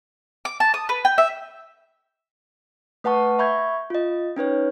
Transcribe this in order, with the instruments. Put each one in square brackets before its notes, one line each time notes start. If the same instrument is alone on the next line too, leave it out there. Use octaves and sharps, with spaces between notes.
[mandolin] D6
A5
D#6
B4
G5
E5
[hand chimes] A3 B4 F#5 A5 C#6
E5 B5 C#6 G6 G#6
F4 D#5
C#4 D#4 B4 C#5